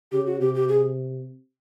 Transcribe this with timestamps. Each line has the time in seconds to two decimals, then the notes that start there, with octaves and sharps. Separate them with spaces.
0.12 C#3 G4
0.27 F#4
0.40 C3 G4
0.55 G4
0.69 G#4